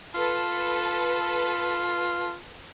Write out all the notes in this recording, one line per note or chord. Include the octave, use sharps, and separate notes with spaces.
F4 A4 B4